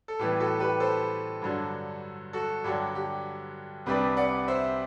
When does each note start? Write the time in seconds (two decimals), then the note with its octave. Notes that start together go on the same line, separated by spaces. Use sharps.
0.08 A4
0.19 A2 E3 G3 B3 G4
0.40 F#4 A4
0.60 G4 B4
0.80 A4 C5
1.42 G2 D3 F#3
2.33 F#4 A4
2.64 G2 D3 F#3 G4
2.95 G4
3.86 C2 C3 G3 D4 G4 B4
4.17 D5 F#5
4.48 C5 E5